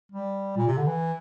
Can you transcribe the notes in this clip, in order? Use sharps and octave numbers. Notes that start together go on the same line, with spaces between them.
G3
A#2
C3
D3
E3